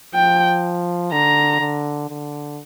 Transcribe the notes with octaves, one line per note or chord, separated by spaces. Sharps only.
F3 G5
D3 A#5
D3
D3